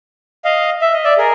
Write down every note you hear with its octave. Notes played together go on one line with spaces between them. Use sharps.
D#5 F5
E5
D#5
D5 E5
G#4 A#4